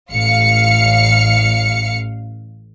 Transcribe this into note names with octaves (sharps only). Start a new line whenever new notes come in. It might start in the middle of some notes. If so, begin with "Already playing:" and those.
A1 F5 C#7